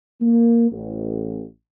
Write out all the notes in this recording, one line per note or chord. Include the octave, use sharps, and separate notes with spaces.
A#3
A1